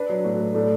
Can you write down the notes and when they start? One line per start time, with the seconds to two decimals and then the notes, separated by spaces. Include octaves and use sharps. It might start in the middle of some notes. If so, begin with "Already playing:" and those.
Already playing: D4 B4
0.09 F#3
0.24 A2 F#4
0.40 A3
0.55 A2 D4